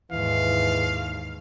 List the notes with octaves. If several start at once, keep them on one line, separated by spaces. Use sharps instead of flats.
D#2 G#2 E3 F5